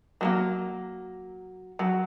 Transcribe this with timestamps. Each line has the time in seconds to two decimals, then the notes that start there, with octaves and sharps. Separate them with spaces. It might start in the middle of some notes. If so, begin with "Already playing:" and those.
0.21 F#3 G#3 A#3
1.79 F#3